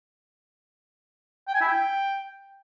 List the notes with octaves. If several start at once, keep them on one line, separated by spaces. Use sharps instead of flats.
G5
G#5
E4
G5